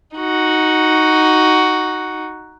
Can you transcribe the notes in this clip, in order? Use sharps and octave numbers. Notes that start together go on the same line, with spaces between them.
D#4 F#4